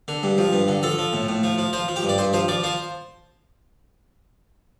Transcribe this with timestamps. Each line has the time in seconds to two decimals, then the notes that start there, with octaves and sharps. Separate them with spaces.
0.08 D3
0.23 G2
0.38 F3
0.53 G2
0.68 D3
0.83 F3 A4
0.98 F3
1.13 A2
1.28 A2
1.43 F3
1.58 F3
1.73 F3 C5
1.88 F3
1.96 G4
2.03 G2
2.09 D5
2.18 G2 C5
2.33 F3 C5
2.48 F3 D5
2.63 F3 C5